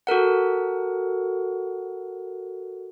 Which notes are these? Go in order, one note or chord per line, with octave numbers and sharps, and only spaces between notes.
F#4 A4 A#4 F#5